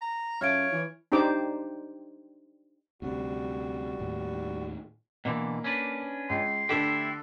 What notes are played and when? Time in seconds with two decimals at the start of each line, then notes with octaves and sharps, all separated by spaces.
0.01 A#5
0.41 F#2 E4 F4 C#5 A5 F6 G#6 D7
0.72 E3
1.12 D4 D#4 G4 C5 D6
3.02 D2 C3 G3 F#4
3.99 D#2 A2
5.25 B2 D3 E3 A#3
5.64 C#4 D4 B4
6.29 C#2 C6
6.69 D3 A3 E4 G4 A4